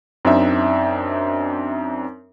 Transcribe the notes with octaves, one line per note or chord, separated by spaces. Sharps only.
F#2 C4 D4 D#4 E5